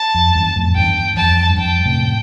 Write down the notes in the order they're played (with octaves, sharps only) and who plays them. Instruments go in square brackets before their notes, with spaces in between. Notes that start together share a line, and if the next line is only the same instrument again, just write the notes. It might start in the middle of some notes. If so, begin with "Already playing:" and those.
Already playing: [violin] A5
[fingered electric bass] F2
E2 G2
F2 A2
[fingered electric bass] E2 G2 [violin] G5
[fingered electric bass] F2 [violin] A5
[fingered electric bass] G2
[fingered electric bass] F2 [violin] G5
[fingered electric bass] A2 C3